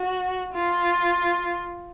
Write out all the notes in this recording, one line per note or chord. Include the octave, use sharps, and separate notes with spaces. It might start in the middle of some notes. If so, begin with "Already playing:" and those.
Already playing: F#4
F4